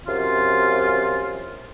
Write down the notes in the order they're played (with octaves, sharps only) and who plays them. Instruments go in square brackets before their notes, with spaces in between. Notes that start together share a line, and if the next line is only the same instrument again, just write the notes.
[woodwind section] F#2 C3 F4